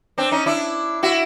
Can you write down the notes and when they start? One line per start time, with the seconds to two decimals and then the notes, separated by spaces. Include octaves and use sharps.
0.18 C4 D4
0.31 C#4 D#4
0.46 D4 E4
1.03 E4 F#4